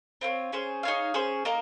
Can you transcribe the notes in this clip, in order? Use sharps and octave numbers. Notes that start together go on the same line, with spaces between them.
C4 F4 A#4 C#5
C#4 G#4 C5
D#4 G#4 C#5 F5
C#4 G#4 C5
A#3 D#4 A#4